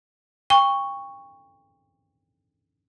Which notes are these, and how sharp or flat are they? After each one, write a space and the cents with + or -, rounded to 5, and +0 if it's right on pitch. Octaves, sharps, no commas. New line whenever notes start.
G5 +30 C#6 +0